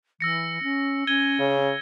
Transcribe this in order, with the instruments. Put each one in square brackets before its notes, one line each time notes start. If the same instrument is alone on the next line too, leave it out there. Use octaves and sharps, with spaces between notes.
[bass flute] E3 [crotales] E6 A#6 C#7
[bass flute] C#4
[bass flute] C#4 [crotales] G#6 D#7 G7
[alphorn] C#3